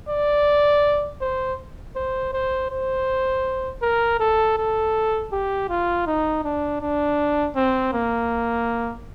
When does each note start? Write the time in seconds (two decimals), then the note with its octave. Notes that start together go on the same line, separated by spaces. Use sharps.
0.09 D5
1.21 C5
1.96 C5
2.33 C5
2.71 C5
3.82 A#4
4.20 A4
4.58 A4
5.32 G4
5.70 F4
6.07 D#4
6.44 D4
6.81 D4
7.56 C4
7.93 A#3